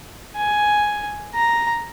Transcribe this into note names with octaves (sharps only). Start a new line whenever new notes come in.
G#5
A#5